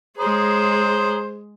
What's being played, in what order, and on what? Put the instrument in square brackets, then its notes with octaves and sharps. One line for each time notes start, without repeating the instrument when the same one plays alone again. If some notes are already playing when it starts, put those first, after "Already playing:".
[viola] G#3 G#4 [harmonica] C5 [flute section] C#5 A#5 D#6